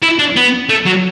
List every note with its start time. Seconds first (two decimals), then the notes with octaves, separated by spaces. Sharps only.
0.03 E4
0.19 D4
0.36 B3
0.69 A3
0.86 F#3